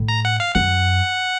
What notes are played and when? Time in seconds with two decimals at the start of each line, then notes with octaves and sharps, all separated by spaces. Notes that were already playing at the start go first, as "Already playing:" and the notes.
Already playing: A2
0.08 A#5
0.25 F#5
0.40 F5
0.55 F#2 F#5